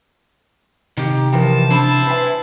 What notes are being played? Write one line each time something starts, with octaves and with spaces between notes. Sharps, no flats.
C3 D#3 G4
E3 F3 G4 A#4 D#5 A5
D4 E4 C5 B5
B4 D#5 E5 G#5